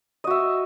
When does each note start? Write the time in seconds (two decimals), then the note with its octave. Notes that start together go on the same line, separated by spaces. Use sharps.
0.24 D#5
0.27 F#4
0.30 E5